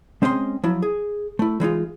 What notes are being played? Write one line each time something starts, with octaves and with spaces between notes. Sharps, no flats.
G#3 C4 C#4 D#5 F#5 C6
F3 F#3 E4
G#4
A3 E4
E3 G#3 D#4 F4